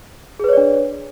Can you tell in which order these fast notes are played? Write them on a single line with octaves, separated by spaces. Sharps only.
G#4 B4 C#5 D5 D4